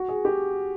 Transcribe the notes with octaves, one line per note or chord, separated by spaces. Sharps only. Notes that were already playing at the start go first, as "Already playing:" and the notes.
Already playing: F#4
G#4
G4